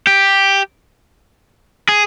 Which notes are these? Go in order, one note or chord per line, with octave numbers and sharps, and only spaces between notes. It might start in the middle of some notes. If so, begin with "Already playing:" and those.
G4
G#4